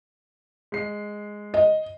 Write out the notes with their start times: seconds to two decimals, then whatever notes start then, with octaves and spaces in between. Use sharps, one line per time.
0.72 G#3 C7
1.54 D#5